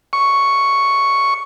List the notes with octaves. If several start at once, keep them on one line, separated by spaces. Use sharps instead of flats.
C#6